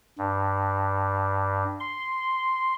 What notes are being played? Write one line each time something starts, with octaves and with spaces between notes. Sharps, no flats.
G2
C6